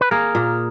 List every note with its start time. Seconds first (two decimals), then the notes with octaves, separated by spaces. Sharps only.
0.01 B4
0.11 A#3 G#4 A#4
0.35 A#2